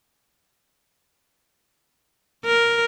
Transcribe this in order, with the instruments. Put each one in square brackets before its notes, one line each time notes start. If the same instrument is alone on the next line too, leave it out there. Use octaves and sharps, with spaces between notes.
[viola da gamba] A#4